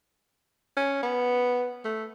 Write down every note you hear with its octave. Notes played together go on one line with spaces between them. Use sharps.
C#4
B3
A3